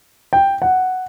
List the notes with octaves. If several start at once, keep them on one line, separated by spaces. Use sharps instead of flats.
G5
F#5